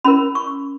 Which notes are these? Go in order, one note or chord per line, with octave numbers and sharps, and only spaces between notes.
C#4 E4 A#4 B5
C#6